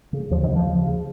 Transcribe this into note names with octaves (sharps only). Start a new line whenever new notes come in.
C#3
D#2 F3
D#3
C#3
F3
D#2
C#3